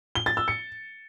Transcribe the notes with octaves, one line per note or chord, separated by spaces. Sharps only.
G7
A6
E6
C#7